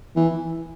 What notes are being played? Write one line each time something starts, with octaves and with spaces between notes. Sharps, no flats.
E3